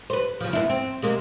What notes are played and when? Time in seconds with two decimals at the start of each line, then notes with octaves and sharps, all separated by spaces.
0.10 B4 C5
0.41 C#3 F3
0.53 B3 D4 E4
0.70 C4
1.02 C3 G#3 A#3